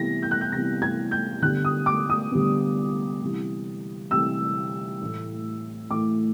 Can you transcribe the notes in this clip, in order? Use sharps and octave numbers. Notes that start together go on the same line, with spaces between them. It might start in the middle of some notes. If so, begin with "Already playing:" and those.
Already playing: C3 E3 G3 B3 A#6
G6
F#6
G6
C3 E3 G3 B3 A#6
G#6
G6
D3 G3 B3 F#6
D#6
D6
D#6
D3 G3 B3
C3 E3 G3
C3 E3 G3 E6
A2 E3 A3
A2 E3 A3 D6